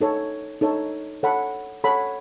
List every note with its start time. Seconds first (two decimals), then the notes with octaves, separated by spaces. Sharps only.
0.01 D#4 A4 C#5
0.61 D#4 A4 C#5
1.23 A4 C#5 F#5 B5
1.84 A4 C#5 F#5 B5